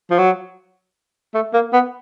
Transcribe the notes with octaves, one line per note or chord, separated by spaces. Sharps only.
F3
F#3
A3
A#3
B3